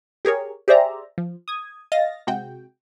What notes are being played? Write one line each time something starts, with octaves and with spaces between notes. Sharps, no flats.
G4 G#4 A#4 C#5
G4 G#4 C5 D5 E5 A#5
F3
D#6 G#6
D#5 F5 A6 A#6
C3 G#3 F#4 G5